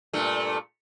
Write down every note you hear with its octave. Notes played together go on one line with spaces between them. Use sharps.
G2 A#2 A3